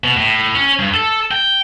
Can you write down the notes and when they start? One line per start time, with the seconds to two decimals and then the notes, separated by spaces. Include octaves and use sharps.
0.04 B2
0.17 A2
0.55 C#4
0.79 G2
0.94 A4
1.31 G5